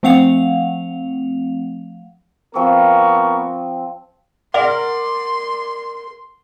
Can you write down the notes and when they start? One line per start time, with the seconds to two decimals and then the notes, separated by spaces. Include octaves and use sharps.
0.03 F3 A3 C4 F5 F#5 F7
2.55 F3 B3 C4 A#4 C#6
4.54 A#4 D5 F#5 C6